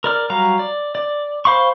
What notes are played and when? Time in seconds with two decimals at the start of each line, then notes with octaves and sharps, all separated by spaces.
0.04 A#4 D5 F6
0.30 F#3 G3 F5 A#5
0.59 D5
0.95 D5
1.45 C5 F5 B5 C#6